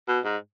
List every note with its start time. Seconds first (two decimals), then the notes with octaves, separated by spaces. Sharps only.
0.08 B2
0.25 G#2